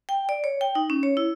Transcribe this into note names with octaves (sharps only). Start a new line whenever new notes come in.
G5
D5
C#5
G5
D#4
C#4
C#5
E4